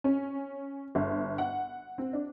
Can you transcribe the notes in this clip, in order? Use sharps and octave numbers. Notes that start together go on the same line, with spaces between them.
C#4
G1
F#5
C4
D4